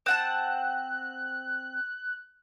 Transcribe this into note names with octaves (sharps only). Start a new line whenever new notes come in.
C4 F#5 A5 F#6